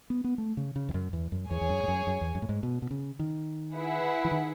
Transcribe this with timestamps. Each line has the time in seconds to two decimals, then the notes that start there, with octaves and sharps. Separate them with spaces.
0.10 B3
0.24 B3
0.38 A3
0.57 C#3
0.76 C#3
0.89 E2
0.94 F#2
1.13 E2
1.32 F#2
1.50 E2 G#4 C#5 G#5
1.61 E2
1.69 F#2
1.83 G#2
1.88 F#2
2.07 F#2
2.21 E2
2.35 F#2
2.42 A2
2.49 G#2
2.63 B2
2.82 B2
2.91 C#3
3.19 D#3
3.75 E4 G#4 B4 F#5
4.25 E3
4.31 D#3